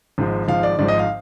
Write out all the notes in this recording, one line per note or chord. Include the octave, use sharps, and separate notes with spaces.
G#1 G#2 F3
G#1 G#2 F3 F5
D5
G#1 G#2 F3 D5
D#5
F5